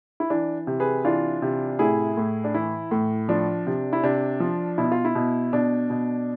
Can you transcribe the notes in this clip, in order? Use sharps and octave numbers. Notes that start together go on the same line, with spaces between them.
E4
E3 D4
C3
G#4 B4
E3 D4 F4
C3
A2 E4 G#4
A2
D4
E3 E4
A2
F3 D4
C3
E4
C3 D4
F3
B2 E4
F4
E4
B2
B2 D4
B2